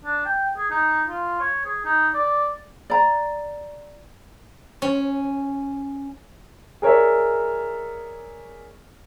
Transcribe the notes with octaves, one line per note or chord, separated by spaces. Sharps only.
D4
G5
G#4
D#4
F4
C#5
G#4
D#4
D5
D5 A#5
C#4
G#4 A#4 C#5 D5 E5